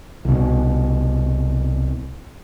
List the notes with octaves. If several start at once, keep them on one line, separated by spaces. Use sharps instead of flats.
C2 B2